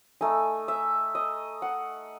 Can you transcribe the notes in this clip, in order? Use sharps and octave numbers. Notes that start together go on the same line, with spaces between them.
A3 D#4 G#5
E5
D#5
F#5